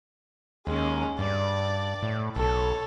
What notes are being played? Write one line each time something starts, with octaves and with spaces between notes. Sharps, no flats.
D#2 G#3 C#4
G2 D5
A2
B1 A4 C#5